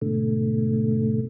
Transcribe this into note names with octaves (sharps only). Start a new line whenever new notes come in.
G#2 B2 D3 A3